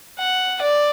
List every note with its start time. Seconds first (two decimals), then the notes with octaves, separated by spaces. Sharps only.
0.19 F#5
0.62 D5